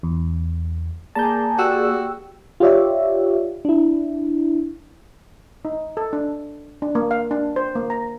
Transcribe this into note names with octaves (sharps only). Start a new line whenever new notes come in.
E2
A#3 G#4 D5 A5 A#5 G6
F#4 G4 G5 E6
F4 G4 C#5 D5 E5
D4 E4
D#4
A4
D4
D4
A#3
F5
D4
C5
A#3
A#5